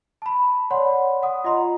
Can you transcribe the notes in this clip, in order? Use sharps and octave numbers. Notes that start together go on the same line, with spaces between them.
A5 B5
C#5 D5 F#5 B5 C6
F#5 D#6
F4 D#5 A#5 C6